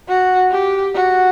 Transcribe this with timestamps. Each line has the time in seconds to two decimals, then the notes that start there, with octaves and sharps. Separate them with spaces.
0.09 F#4
0.51 G4
0.94 F#4